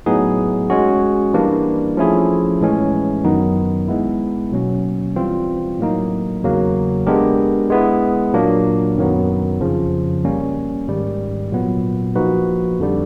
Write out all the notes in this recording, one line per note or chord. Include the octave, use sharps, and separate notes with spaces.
A2 F#3 B3 D#4 G#4
G#3 C#4 F#4
E3 G3 A#3 D4
F3 A3 C#4 E4 G#4
A2 E3 G#3 C#4
F#2 D#3 F#3 B3 D#4
G#3 B3 E4
B2 F#3 A#3 C#4
E3 G3 C4 F4
A2 F#3 A#3 D#4
E2 C#3 F#3 A#3
G#3 B3 D4 G4 A#4
G#3 B3 E4
A#2 F#3 A#3 D4
F#2 D#3 F#3 B3
F2 C#3 F3
G3 A#3 C#4
G#2 D#3 G3
A#2 F#3 B3
F3 A#3 D#4 F#4 B4
F2 D3 G3